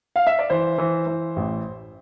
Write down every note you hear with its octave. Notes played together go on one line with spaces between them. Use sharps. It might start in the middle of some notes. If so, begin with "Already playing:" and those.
F5
E5
D5
E3 C5
E3
E3
A1